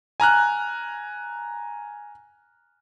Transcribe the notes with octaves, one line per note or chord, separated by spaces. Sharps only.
G#5 A#5 F6 F#6